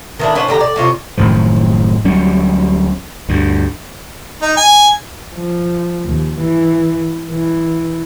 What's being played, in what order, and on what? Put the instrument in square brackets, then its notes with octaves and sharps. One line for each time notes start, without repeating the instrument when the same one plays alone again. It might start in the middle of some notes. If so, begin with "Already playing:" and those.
[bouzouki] D#3 E3 D4
C#4 D4 B4 C5
D3 G4 A#5
D5
C3 C#4 F4
[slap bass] F#1 A2 D#3 F3
D2 F#3 G3 C#4
D2 G2
[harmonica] D#4
G#5
[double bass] F3
D#2
E3
E3